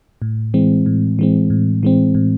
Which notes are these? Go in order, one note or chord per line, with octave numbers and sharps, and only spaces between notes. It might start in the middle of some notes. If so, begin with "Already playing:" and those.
A2
E3 G#3 C4
A2
E3 G#3 C4
A2
E3 G#3 C4
A2